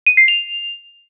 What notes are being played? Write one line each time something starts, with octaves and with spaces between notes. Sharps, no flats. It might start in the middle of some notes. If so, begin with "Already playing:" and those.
D#7
C7
F7